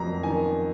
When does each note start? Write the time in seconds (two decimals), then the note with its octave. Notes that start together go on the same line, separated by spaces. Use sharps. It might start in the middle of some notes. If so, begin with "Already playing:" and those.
Already playing: F2 F#3 A#5
0.23 D#3 G#5